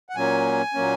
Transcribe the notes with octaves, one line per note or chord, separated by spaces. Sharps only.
F#5
A#2 F#3 A#3 C#4 G#5
A#2 F#3 A#3 C#4